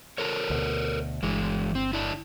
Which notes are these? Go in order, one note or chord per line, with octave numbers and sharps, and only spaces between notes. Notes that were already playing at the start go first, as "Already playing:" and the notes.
A4 A#4 C#5
D2 B2
G1 E3 G#3
C4
D3 D4 E4